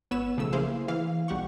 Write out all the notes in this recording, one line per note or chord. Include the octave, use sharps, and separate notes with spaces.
G#1 B3 B4 C#5 E6 E7
B1 C#3 F3 A3 E6
A#3 E4 G#4 C5 F5
E3 F5
B1 G3 G4 F#5 C#6